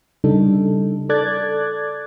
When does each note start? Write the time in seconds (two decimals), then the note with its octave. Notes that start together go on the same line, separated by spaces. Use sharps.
0.24 C#3 G3 D4 D#4 A4
1.09 A4 D5 D6 F#6 G#6 A6